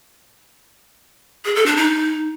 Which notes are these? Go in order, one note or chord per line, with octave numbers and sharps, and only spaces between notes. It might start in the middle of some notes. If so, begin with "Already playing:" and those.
G#4
A4
D4
D#4